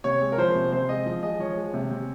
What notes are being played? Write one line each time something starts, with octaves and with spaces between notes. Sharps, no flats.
C3 C#5
G#3
A#4
F3 C5
C3
C3 C5
G#3 D#5
F3
G#3 D#5
F3 C#5
G#3
C3
C3